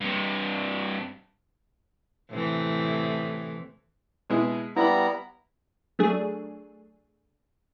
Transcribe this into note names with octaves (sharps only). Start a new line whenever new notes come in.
G2 C3
A2 C3 E3
B2 G#3 E4
G3 B3 E4 A#5 B5
F#3 A3 D4 G#4